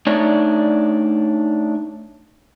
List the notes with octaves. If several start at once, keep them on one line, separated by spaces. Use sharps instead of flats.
A3 D4 D#4 C#5 D5